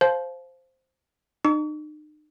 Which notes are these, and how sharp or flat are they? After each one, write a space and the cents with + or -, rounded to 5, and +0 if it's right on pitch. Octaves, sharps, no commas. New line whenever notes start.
C5 +0 F5 +0 A5 -30
D#4 -40 C#6 +45